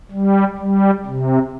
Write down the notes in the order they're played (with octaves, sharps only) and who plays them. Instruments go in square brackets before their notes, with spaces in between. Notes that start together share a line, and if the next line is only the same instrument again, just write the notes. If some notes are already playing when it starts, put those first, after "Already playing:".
[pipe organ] G3
G3
C3